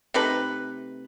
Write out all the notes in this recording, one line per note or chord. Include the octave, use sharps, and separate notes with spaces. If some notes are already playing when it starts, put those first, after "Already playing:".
C3 A3 D#4 B4